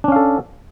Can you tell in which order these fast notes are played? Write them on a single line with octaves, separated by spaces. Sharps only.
D4 C#4 F5 A4